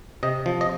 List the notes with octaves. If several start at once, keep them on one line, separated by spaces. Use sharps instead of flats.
C3 D#5
F3
D#5